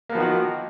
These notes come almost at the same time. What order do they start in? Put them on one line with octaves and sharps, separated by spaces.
A#3 B3 F3 D#3 F#4